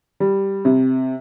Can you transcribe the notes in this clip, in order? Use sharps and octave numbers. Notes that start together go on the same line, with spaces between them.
G3
C3